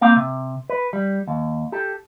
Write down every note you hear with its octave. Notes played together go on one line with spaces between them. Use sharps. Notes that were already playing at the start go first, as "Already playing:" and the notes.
A#3 C4 F5
C3
B4
G3
D#2
G4 A4